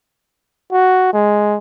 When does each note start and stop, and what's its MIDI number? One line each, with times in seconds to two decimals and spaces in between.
0.72 1.12 66
1.13 1.58 56